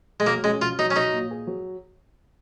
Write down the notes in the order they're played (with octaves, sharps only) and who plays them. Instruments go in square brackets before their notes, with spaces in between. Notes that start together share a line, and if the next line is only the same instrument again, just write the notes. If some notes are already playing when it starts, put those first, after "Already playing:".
[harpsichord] G#3
[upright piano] F#3 [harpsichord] A#3
[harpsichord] G#3 [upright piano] C#4
[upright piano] F#3 [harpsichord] F4
[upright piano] F#3 [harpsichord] D#4
[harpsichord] C#4
[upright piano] F#3 [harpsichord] D#4
[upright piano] A#2
G#4
F#3